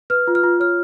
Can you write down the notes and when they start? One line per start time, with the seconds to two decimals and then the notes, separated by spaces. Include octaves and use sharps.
0.10 B4 F6
0.27 F4
0.35 F6
0.44 F4
0.60 C#5 F6